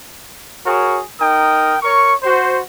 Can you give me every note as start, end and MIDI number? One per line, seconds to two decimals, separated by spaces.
0.65 1.00 66
0.65 1.00 68
0.65 1.00 70
0.65 1.00 73
1.19 1.76 63
1.19 1.76 70
1.19 1.76 79
1.19 1.76 87
1.83 2.13 70
1.83 2.13 73
1.83 2.13 85
2.23 2.60 66
2.23 2.60 72